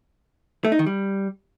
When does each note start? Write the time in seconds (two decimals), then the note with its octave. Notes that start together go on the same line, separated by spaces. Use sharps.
0.65 A3
0.72 D#4
0.79 D#3
0.86 G3